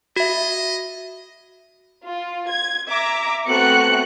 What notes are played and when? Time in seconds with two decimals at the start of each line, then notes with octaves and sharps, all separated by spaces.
0.16 F#4 D#5 E5
2.05 F4
2.50 G#6
2.89 E5 A#5 D6
3.47 A3 B3 C4 F#4 F#6 C#7